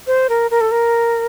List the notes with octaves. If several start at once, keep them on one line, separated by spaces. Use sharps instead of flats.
C5
A#4
A#4
A4
A#4